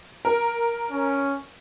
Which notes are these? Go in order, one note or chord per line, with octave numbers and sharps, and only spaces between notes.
A#4
C#4